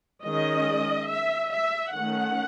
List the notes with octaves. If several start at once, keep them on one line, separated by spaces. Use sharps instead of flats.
D#3 G#3 C#4 D#5
E5
E5
D#3 A3 C#4 F#5